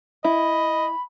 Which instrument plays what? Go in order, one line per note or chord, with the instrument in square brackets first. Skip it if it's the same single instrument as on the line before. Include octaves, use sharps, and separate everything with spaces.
[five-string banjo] E4 [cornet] D#5 [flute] B5